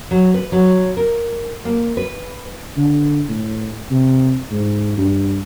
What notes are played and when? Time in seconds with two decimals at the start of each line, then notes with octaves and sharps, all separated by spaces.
0.11 F#3
0.34 B4
0.52 F#3
0.97 A#4
1.65 A#3
1.97 B4
2.77 D3
3.29 A2
3.90 C3
4.51 G#2
4.98 G2